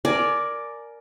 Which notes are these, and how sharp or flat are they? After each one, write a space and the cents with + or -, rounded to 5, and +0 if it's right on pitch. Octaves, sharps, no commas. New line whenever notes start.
A#4 +0 D5 +0 G#5 +25